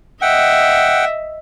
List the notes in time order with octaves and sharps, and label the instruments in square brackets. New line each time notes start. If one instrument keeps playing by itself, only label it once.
[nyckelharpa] D#5 E5 [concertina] F#5 G5